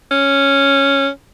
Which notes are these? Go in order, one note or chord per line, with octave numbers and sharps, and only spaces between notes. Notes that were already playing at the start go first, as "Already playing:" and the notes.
C#4